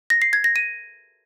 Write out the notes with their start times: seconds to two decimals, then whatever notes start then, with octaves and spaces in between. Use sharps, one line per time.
0.10 A#6
0.22 C7
0.33 G#6
0.44 A#6
0.56 D#7